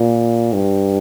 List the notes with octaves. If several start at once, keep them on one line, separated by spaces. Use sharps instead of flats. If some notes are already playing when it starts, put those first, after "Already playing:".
Already playing: A#2
G2